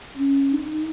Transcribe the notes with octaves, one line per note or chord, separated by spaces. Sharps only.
C#4
D#4